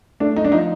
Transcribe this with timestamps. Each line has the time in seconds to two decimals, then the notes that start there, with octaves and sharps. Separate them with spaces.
0.20 A3 D4
0.36 D#4
0.45 D4
0.52 F3 D#4